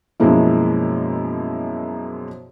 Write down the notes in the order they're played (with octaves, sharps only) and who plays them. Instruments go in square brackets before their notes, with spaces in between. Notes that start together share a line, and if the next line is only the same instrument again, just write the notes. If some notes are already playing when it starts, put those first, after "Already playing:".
[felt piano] F#2 B2 F3 G#3 A#3 E4